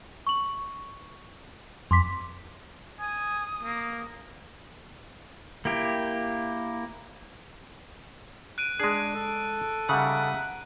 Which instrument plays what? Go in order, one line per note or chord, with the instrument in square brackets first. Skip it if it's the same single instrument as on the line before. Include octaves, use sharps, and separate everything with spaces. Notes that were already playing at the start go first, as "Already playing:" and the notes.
[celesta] C#6 F#7
[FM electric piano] F2 [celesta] C6 D6 B6
[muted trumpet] G#5 [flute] D#6
[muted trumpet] A#3
[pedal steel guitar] A#3 E4 G4
[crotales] F#6 D7 D#7
[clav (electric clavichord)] G#3 G#4 [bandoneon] D4
[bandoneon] A4
[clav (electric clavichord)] C#3 G3 [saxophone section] D#4 E5 F#5